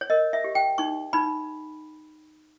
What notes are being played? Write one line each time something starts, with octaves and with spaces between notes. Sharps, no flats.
C#5
A#4 D#5
E5
G4
G5
D#4 C#6
D#4 B5